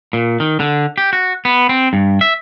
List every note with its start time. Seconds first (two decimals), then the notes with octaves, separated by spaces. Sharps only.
0.13 A#2
0.40 D#3
0.60 D3
0.98 G4
1.13 F#4
1.45 B3
1.69 C4
1.93 G2
2.21 E5